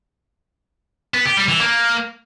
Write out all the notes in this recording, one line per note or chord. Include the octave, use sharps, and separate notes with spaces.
B3
G4
G3
E3
A#3